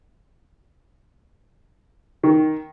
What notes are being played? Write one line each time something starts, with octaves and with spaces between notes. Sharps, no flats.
D#3